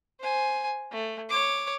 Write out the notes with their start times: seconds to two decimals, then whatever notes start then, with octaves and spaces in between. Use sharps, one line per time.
0.20 C5 G#5
0.91 A3
1.29 C#5 D6